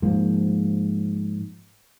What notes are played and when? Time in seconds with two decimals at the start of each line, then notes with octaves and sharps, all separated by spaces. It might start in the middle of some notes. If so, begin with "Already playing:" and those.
0.02 G#2 F3 A#3